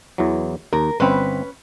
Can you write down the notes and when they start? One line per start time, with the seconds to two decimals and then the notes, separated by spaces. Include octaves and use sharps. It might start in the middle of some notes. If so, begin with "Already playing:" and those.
0.18 E2 E3 F#3
0.73 D#2 A#4
1.00 G1 C4 C#4 B4